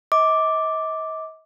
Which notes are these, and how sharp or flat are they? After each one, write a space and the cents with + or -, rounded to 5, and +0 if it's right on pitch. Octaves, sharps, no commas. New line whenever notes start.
D#5 +40 D6 +0